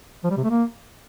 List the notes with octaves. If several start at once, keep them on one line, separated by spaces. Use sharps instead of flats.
F3
G3
C3
A3
A#3